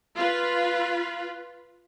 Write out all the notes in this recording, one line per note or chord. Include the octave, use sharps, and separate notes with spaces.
F4 B4